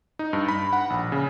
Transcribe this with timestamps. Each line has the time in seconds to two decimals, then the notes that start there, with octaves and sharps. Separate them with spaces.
0.19 D#4
0.33 G2
0.48 B5
0.73 F#5
0.90 A#1
1.12 C#3